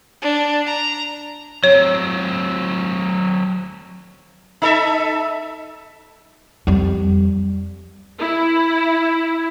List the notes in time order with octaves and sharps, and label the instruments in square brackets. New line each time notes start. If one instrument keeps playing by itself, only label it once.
[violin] D4
A#5
[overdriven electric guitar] F#3 C4 [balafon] C#5
[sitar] D#4 A4 E5
[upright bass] F2 G3
[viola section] E4